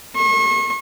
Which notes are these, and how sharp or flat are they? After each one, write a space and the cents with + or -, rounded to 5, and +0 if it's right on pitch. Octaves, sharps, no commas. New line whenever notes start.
C#6 -40